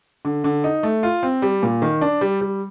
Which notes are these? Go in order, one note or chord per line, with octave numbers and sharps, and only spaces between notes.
D3
D3
D#4
A3
F4
C4
G3
A#2
D#3
D4
G3
G3